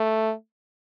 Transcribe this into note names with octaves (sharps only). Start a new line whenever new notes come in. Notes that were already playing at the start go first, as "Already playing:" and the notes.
Already playing: A3